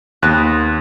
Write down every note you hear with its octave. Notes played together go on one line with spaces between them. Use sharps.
D#2 B3 C4 F#6